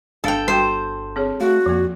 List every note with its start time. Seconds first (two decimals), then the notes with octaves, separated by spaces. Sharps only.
0.24 G1 D4 A4 F5 G5 A5
0.48 G3 F#4 C5 G5
1.16 C4 G#4 C#5
1.40 A3 F#4 F5
1.66 F2 F3 A#3